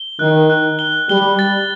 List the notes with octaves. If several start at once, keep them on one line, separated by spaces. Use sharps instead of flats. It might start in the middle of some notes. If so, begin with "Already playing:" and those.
Already playing: G7
D#3 F#6
F#6
G7
G3 G7
A6